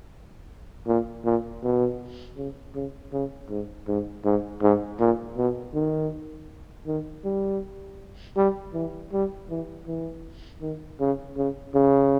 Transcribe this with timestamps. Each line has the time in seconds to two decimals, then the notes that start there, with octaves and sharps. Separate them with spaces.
0.87 A#2
1.25 A#2
1.63 B2
2.37 C#3
2.75 C#3
3.13 C#3
3.49 G#2
3.88 G#2
4.25 G#2
4.62 G#2
5.00 A#2
5.37 B2
5.74 D#3
6.87 D#3
7.25 G3
8.37 G3
8.74 E3
9.13 G3
9.50 E3
9.87 E3
10.62 D#3
11.00 C#3
11.37 C#3
11.75 C#3